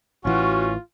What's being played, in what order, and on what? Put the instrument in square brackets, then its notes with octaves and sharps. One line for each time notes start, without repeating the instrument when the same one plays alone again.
[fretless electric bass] A1 E3 [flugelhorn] C#4 [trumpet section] F4 [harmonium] F#4